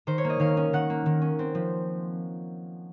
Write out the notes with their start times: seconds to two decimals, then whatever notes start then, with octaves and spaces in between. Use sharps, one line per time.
0.07 D#3 C5
0.18 C#5
0.24 A#3
0.30 D#5
0.40 D#3 F5
0.57 C#4
0.73 D#3 F#5
0.90 A#3
1.06 D#3
1.22 C#4
1.39 C4
1.55 F3